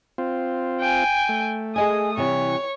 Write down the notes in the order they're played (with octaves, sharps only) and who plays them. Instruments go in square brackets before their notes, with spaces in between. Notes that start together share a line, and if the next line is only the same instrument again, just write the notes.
[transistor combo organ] C4 F4
[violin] G5 G#5
[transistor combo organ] A3
[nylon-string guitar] G#4 D#5 G#5 [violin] D#6
[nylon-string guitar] C3 E3 G3 [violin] C#5